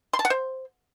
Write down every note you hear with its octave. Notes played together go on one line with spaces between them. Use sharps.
C6
A5
F#5
C5